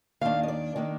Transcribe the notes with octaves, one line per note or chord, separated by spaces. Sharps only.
D#2 D#3 A#3 D4 F5
D#5
D5
D#3 A#3 D4